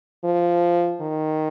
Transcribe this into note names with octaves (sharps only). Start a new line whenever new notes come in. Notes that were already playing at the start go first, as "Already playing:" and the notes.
F3
D#3